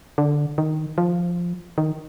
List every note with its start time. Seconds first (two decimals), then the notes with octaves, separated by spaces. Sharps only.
0.18 D3
0.58 D#3
0.98 F3
1.78 D#3